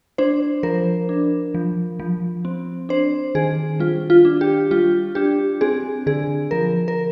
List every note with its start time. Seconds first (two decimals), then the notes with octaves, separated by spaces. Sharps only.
0.18 D4 C5
0.63 F3 A#4
1.09 D4
1.54 F3
1.99 F3
2.45 C4
2.89 D4 C5
3.35 D#3 G#4
3.79 G3 F4
4.10 F4
4.25 D4
4.41 G4
4.71 G3 F4
5.15 D4 G4
5.61 C4 G#4
6.06 D3 G#4
6.51 F3 A#4
6.88 A#4